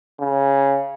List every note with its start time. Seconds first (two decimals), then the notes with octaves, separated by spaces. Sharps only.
0.19 C#3